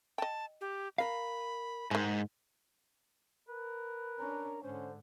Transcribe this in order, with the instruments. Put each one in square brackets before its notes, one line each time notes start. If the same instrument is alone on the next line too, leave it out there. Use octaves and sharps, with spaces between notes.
[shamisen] D#5 G5 [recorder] A5
[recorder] G4
[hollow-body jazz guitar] A#4 F5 [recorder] B5
[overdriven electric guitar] G#2 [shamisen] D#3 G#3
[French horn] A#4 [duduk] B4
[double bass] C#4 D4 [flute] A#5
[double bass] G#2 [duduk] D3 [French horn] C#4 [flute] C5